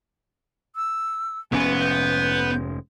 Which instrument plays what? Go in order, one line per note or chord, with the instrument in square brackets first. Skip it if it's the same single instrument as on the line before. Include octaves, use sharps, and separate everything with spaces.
[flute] E6
[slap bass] F1 G#2 C#4 [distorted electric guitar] B3 [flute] G#5
[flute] G6